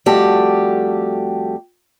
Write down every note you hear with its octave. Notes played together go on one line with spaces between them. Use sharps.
F2 G3 A3 F#4 G4 A5